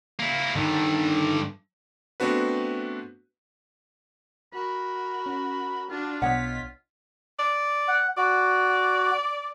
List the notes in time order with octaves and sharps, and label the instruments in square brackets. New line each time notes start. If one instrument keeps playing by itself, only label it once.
[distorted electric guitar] A#3 E4
[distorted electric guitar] G2 D3 [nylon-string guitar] D#3
[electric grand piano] A3 B3 C4 D4 F#4 B4
[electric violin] F#4 A#4 [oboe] B5
[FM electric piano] C#4
[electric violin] D4 F#4 [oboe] F4
[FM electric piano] B1 B3 D#5 [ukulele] C#5 F#5 [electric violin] B6
[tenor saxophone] D5
[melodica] F#5
[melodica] F#4 [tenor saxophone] D5